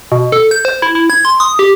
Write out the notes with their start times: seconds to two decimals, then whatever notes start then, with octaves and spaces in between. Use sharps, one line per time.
0.12 B2
0.32 A4
0.51 G6
0.65 C5
0.82 E4
0.95 E4
1.10 G#6
1.25 C6
1.40 D#6
1.59 G4